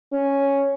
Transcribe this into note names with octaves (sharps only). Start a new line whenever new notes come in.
C#4